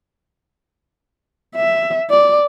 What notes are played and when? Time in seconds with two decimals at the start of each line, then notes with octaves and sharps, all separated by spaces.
1.56 E5
2.10 D5